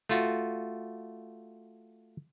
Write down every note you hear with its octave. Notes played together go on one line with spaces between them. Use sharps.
A3 F4 F#4